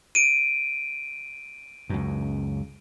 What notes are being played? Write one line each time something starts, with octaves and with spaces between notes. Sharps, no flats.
D7 D#7
C#2 F#2